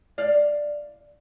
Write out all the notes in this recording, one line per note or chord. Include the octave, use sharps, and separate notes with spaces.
D5 F5